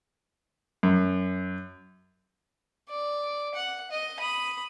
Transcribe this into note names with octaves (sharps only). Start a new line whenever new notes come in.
F#2
D5
F#5
D#5
B5 D#6